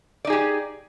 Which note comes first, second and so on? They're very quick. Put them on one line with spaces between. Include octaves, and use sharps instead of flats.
D5 D#4 G#4 G4